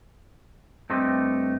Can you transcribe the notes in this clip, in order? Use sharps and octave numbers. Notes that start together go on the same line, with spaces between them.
G2 A3 C4 G4 D#5